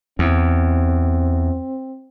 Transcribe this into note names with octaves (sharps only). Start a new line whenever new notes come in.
E2 C4